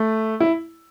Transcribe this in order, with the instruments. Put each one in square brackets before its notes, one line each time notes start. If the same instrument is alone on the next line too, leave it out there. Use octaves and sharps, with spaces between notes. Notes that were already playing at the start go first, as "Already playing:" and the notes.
Already playing: [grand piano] A3
E4